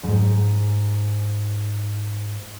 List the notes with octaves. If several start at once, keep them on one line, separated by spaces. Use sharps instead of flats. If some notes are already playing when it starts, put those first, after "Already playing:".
E2 G#2